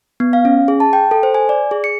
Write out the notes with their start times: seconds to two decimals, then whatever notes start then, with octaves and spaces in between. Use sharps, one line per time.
0.20 B3
0.33 F5
0.45 C#4
0.68 G#4
0.80 A5
0.93 G5
1.11 A4
1.23 C5
1.34 G#5
1.49 D5
1.71 G#4
1.84 C#7